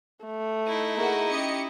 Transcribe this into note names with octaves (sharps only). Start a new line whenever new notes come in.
A3
D#4 E4
A#3 F#4 G#4 A#5
C#4 G4 D#5 C#7